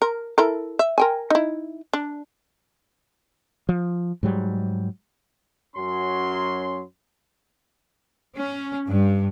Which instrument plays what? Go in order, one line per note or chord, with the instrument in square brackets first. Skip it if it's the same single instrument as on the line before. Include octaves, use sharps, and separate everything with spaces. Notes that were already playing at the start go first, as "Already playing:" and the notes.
[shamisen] A#4
E4 A4 A#4
E5
A#4 G5 G#5
D#4 E4
D4
[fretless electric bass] F3
G#2 F#3 G3
[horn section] F#2 F#3 C#4 C6
[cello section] C#4
G2